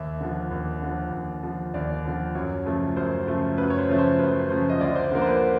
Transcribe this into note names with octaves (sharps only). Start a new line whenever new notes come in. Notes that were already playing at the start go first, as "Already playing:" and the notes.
Already playing: D#2 E5
D3 F3
D#2
D3 F3
D#2
D3 F3
D#2 D5
D3 F3
F#2 C#5
C#3 F3 A3
F#2 C5
C#3 F3 A3
F#2 B4
C#5
C5
C#3 F3 A3
C5
F#2 B4
C#3 F3 A3 C5
D#5
D2 D5
C5
D3 F3 A#3 C5
C5
B4